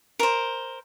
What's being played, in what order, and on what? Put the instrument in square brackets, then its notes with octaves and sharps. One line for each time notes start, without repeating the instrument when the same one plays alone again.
[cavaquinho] A#4 C5